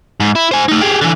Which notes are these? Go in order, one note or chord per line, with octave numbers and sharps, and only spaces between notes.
G#2
E4
C5 G#5
A3 D#4
G4 G#4
D3 E3